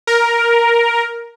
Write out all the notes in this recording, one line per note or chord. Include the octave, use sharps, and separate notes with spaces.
A#4